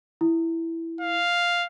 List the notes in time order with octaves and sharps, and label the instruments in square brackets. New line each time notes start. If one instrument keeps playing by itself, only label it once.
[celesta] E4
[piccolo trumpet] F5